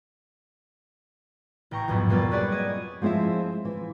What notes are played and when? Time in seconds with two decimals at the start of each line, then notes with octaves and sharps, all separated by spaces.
1.71 A1 G5 A#5 C#6
1.88 B1 F2 G#2 B3
2.09 G3 A#3 B3 F4 A4 D5
2.31 C4 F#4 G#4 B4 C#5 D5
2.52 D#5 G#6
3.02 F3 G#3 C4 E4 E5
3.65 E3